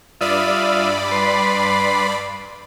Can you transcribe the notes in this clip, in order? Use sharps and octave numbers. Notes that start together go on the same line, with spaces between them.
G2 F4 D5 E5 B5 D#6
B4 C6